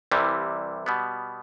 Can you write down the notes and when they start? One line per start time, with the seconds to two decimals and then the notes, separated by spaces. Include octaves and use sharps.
0.12 C2 C3 E3 G3
0.86 B2 G3 B3